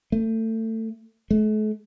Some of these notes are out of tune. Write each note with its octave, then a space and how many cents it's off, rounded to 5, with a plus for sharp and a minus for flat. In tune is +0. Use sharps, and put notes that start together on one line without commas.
A3 +25
A3 -45